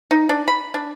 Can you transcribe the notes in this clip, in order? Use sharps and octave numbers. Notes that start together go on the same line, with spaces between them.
D#4
D4
B5
D4